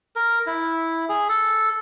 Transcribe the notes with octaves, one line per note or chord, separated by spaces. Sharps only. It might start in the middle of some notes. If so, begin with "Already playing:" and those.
A#4
E4
G#4
A4